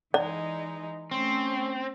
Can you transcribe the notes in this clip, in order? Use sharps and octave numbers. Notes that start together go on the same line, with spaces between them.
E3 G#3 D#4 D5
A3 C4 C#4